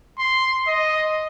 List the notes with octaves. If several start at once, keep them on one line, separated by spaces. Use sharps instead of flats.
C6
D#5